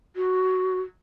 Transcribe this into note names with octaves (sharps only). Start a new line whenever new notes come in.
F#4